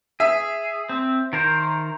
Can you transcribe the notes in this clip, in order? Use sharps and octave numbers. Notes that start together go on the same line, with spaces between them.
G#4 E5
C4
D#3 A#4 C5